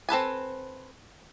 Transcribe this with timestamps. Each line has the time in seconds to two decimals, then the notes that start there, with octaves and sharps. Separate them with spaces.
0.09 C4 A4 B4 G#5